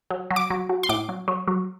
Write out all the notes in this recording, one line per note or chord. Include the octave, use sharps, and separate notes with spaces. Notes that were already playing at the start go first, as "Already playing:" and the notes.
F#3
F#3
D6
F#3
F#3
C6
A2 D6
F#3
F#3
F#3